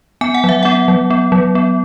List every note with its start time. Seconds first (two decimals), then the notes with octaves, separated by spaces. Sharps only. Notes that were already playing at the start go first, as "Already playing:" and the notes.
0.21 B3 G#5
0.34 F#5
0.44 F#3 E5
0.63 B3 F#5
0.88 F#3
1.10 B3
1.32 F#3
1.55 B3